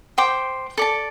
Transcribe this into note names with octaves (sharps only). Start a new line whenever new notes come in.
C5 G5 D6
A4 D5 A5